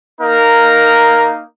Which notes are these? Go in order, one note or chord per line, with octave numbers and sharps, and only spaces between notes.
A#3 D#4 A#4